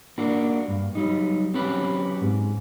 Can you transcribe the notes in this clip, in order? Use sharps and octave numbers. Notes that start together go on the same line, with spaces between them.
A#3 D4 F#4
G2
F#3 G3 D#4
F#3 C4 C#4 G4 B4
G#2